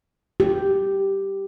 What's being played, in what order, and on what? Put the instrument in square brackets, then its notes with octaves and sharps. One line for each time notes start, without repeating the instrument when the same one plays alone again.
[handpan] G4